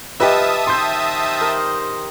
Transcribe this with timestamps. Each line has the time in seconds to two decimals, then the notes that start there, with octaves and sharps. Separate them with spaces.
0.20 F3 G4 B4 D#5 E5 F#5 A5 D#6
0.67 D#3 C5 D#5 C6 G6
1.41 A#4